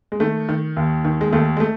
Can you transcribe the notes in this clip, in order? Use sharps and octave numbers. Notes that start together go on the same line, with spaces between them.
G#3
D#3 A3
D#3
D#2
D#3
G#3
D#2 A3
G#3
A3